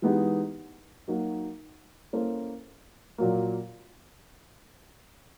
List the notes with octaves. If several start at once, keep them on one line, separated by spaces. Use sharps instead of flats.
E3 G#3 B3 D#4 G4
F#3 A#3 D#4 F#4
A#3 C#4 E4 A4 C5
A#2 F#3 A#3